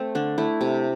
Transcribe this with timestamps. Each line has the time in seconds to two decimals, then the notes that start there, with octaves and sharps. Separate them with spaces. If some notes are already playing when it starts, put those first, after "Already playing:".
Already playing: A3 C4
0.15 D3 D4
0.38 A3 E4
0.61 C3